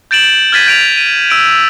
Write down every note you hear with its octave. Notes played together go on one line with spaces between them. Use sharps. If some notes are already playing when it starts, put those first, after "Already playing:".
G6 A6 D7 E7 F#7
F6 G#6 A6 B6 D#7
G6 D7 F7
D#7
E6 D7